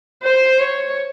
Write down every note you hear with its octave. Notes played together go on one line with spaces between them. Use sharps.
C5
C#5